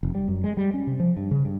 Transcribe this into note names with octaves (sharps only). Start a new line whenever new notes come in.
F1
G3
F#2
G#3
G3
C#4
C3
F3
G2
C#3
G2